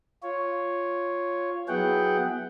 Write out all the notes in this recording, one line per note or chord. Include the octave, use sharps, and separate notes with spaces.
F4 C#5
F#3 B3 E4 G#4 F#5 G5